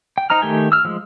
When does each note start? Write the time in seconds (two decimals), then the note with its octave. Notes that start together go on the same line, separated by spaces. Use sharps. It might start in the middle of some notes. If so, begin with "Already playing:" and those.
0.18 G5
0.30 D#4 C5 A#5 F6
0.42 D#3 A3 G4 G5 G#5
0.72 E6 F6
0.85 F3 G#3